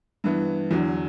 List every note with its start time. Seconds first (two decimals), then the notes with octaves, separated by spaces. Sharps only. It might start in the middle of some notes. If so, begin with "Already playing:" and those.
0.24 G2 E3 B3
0.71 E2 D3 F#3